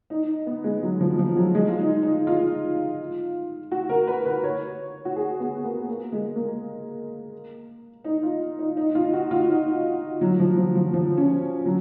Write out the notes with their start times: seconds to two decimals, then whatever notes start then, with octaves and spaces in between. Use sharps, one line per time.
0.10 D#4
0.46 B3
0.64 G#3
0.83 F#3
1.01 F3
1.19 F3
1.37 F#3
1.55 G#3
1.68 F4
1.79 D#4
2.03 D#4
2.27 F4
3.72 F#4
3.89 A#4
4.07 B4
4.26 B4
4.44 C#5
5.05 F#4
5.16 G#4
5.40 B3
5.64 A#3
5.88 A#3
6.12 G#3
6.36 A#3
8.04 D#4
8.23 F4
8.59 D#4
8.77 D#4
8.95 F4
9.13 F#4
9.31 F4
9.50 D#4
10.21 F#3
10.40 F3
10.57 F3
10.75 F3
10.93 F3
11.17 C#4
11.66 F#3